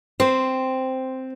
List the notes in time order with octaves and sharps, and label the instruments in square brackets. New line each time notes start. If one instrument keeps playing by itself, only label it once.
[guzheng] C4 [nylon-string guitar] C5